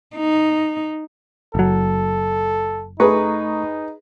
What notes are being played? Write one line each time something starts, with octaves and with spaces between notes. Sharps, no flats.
D#4
F#1 F#3 A4
A3 D#4 G#4 B4 A#5 C#6